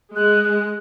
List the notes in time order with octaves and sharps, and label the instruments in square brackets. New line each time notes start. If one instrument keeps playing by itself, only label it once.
[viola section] G#3 [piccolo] F#6
[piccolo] F#6